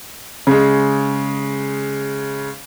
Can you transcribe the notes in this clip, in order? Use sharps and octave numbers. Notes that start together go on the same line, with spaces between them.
C#3 G#3